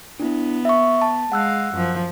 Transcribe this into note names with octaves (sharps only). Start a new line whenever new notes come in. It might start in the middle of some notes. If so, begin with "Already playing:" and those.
B3 D4 E4
E5 C#6
A5
G#3 F5 F#5 E6 F#6
F#2 F3